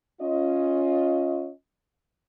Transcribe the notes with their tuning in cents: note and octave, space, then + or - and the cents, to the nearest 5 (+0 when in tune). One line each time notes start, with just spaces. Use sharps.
C#4 +0 F4 +5 D#5 +15